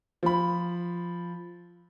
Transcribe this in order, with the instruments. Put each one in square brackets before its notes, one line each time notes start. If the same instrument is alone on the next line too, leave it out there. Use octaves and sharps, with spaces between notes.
[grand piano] F3 B5